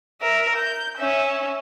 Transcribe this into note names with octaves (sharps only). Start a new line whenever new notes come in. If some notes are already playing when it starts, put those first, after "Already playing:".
A#4 E5
G6
C#4 E5